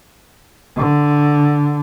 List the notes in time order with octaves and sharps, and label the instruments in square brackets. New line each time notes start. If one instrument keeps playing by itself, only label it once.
[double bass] D3